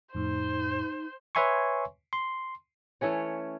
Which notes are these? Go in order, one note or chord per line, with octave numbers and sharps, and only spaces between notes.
F2 A2 D#4 C5
B4 C#5 E5 G#5 C6 C#6
C6
E3 A3 C#4 C#5